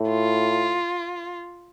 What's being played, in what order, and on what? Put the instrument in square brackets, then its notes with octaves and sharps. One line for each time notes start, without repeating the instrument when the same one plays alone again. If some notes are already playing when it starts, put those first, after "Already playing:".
Already playing: [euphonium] A2
[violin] F4